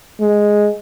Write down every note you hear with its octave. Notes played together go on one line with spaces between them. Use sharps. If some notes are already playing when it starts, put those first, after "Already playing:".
G#3